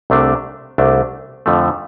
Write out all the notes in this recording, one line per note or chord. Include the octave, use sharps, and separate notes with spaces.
C2 C3 A3 D4
C2 C3 A3 D4
F2 D3 F3 A3